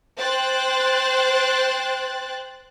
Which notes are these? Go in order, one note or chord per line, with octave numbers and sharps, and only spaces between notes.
C5 G5 F#6 A6